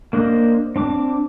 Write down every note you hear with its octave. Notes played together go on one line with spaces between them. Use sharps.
A#3 D4 C5 D#5
C4 D4 D6